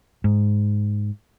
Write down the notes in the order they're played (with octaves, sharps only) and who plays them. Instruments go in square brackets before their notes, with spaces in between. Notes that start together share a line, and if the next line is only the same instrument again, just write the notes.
[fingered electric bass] G#2